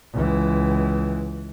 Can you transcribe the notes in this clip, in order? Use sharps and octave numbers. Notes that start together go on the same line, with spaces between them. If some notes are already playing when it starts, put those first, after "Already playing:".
C#2 E3